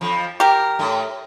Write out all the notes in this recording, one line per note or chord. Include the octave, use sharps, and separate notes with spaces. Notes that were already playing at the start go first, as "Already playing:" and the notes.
F2 F3
G4 A#4
A2 A3